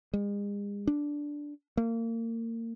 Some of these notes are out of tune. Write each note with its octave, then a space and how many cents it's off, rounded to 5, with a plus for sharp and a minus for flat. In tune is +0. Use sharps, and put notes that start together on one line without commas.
G#3 -40
D4 -5
A#3 -30